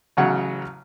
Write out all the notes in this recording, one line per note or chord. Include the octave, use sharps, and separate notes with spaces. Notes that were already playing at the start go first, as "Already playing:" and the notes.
A1 C#3 F#3 F#5